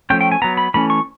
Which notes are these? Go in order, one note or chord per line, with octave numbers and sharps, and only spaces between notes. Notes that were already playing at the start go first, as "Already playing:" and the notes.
F3 A3 C#4 G5
G5
G#5
F#3 B3 A#5
B5
E3 A3 C#4 B5
C#6